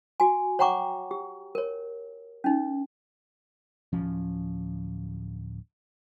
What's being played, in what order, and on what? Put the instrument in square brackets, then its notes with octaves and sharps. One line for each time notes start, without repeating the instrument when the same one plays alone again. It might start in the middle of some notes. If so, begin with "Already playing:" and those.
[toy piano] F#4 G#5
C#5 F#5 G5 A#5 C#6 D6
G4
A#4 C#5
C#4 D#4
[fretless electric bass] D1 F3 C#4